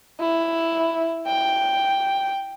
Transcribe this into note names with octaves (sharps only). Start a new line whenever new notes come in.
E4
G5